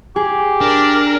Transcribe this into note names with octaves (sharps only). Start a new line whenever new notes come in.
G4 G#4
D4 A#4